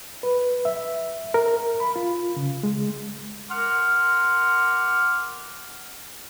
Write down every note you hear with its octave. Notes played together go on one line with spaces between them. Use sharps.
B4
E5
A#4
B5
F4
C#3
G#3
A#4 F#5 C6 D6 F6